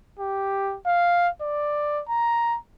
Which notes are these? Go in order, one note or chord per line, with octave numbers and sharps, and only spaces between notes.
G4
F5
D5
A#5